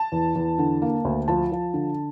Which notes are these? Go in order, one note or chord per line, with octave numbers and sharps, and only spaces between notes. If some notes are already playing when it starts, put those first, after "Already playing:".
Already playing: A5
E2
E2
D3
A#3
D2
F3 A5
F3
D3